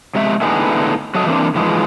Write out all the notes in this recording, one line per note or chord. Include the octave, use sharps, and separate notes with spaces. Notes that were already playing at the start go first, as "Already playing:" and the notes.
C3 G#3 E5
A2 D3 B3 D#4 G#4
F#3 A3 F#4 A4 D#5
E3 A#3 C4 D4
G#2 E3 F3 G#3